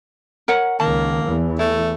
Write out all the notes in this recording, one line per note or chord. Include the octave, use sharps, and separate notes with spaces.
A#4 C#5 F#5
C#2 D#3 A#3 A5
E2 E3
A3 E4